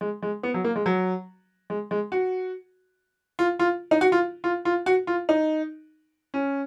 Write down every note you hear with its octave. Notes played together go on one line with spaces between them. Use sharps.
G#3
G#3
B3
F#3
A#3
G#3
F#3
G#3
G#3
F#4
F4
F4
D#4
F#4
F4
F4
F4
F#4
F4
D#4
C#4